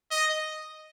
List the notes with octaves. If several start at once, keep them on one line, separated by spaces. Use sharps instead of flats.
D#5